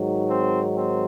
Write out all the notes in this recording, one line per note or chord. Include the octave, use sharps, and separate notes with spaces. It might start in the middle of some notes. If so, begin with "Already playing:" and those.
Already playing: G#2 D#3 F#3
C4
C4